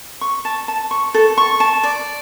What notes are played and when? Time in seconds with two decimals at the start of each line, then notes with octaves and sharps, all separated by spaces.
0.21 C#6
0.45 A5
0.68 A5
0.91 C#6
1.14 A4
1.38 C#6
1.60 A5
1.83 D5